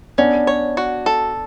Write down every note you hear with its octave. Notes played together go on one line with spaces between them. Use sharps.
B3 C#4 D4
C#5
F#4
A4